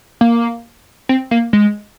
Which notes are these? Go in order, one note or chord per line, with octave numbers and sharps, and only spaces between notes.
A#3
C4
A#3
G#3